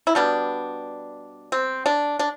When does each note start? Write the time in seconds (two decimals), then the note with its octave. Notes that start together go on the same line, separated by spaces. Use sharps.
0.07 E4
0.15 B2 G3 B3 D4
1.52 C4
1.86 D4
2.19 D4